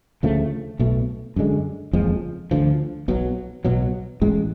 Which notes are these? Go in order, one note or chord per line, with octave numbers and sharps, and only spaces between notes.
D2 C#3 F3 A3
B1 B2 A3
F#2 D3 G#3
F#1 F2 F3 G#3
D2 D3 F3
B1 B2 F#3
B1 B2 F#3
A1 A2 G#3